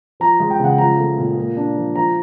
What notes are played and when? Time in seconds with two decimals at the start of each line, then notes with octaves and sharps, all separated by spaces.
0.20 F3 A#5
0.40 G#3
0.50 G5
0.59 C#3 F#5
0.78 F3 A#5
0.98 A3
1.18 A#2
1.37 A#3
1.57 D4
1.77 F3
1.96 F3 A#5